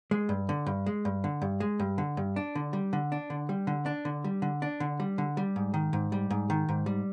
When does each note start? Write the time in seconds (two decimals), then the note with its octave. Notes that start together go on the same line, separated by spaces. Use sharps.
0.11 G#3
0.29 G2
0.49 D3
0.66 G2
0.86 G#3
1.05 G2
1.24 D3
1.42 G2
1.60 G#3
1.79 G2
1.98 D3
2.17 G2
2.36 D4
2.55 D3
2.73 G3
2.93 D3
3.12 D4
3.30 D3
3.49 G3
3.67 D3
3.86 D4
4.05 D3
4.24 G3
4.42 D3
4.62 D4
4.80 D3
5.00 G3
5.18 D3
5.37 G3
5.56 G#2
5.74 D#3
5.93 G#2
6.12 G3
6.30 G#2
6.50 D#3
6.69 G#2
6.86 G3